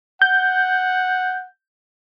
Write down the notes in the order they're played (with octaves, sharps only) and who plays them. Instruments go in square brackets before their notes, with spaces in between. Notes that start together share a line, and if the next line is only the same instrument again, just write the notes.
[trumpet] F#5 [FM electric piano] G6